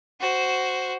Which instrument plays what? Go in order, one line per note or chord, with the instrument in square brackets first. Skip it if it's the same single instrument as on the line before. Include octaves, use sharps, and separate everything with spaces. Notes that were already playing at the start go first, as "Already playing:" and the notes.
[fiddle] F#4 C5